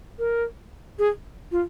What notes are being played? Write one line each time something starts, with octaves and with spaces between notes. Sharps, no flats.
A#4
G#4
F4